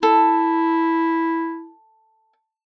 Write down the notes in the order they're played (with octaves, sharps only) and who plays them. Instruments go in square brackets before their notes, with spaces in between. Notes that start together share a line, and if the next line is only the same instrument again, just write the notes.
[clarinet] E4 [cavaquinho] A4